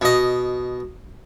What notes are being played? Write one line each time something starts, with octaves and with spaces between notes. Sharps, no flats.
B2 D#5